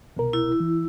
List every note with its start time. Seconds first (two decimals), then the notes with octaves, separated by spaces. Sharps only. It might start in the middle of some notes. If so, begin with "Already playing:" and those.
0.17 C2 B2 A#4
0.33 E4
0.60 E3